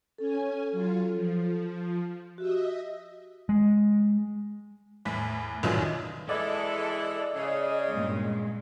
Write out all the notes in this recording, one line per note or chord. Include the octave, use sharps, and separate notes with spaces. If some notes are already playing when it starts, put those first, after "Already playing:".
C#4 A4 G#5
F#3 F4
F3
F#4 G4 D#5 E5
G#3
E2 A2 B6
F1 B1 F#2 D#3 E3 F4
E3 G#3 E4 A4 D5 D#5
C#3 G#4
G2 A#2 G#3